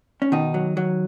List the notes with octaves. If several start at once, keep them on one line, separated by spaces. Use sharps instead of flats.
C#4
B2 D#3 D#4
F#3
F#3